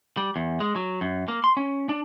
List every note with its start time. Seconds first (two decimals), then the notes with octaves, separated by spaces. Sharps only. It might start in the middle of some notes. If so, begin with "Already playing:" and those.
0.17 G3
0.36 E2
0.60 G#3
0.76 F#3
1.01 F#2
1.28 A#3
1.44 C6
1.57 C#4
1.89 D4